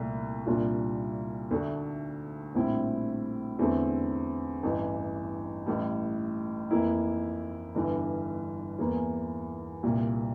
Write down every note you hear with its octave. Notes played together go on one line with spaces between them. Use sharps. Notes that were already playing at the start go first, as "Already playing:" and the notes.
Already playing: C2 A#2 A3
C2 A#2 G3 D4 F4
D2 D3 A3 D4
A#1 A2 G3 C4 E4
E2 D3 A3 C4
A1 G2 E3
A1 A2 G3
F2 E3 A#3 E4
G1 G2 E3
E2 E3 A#3
C2 A#2 G3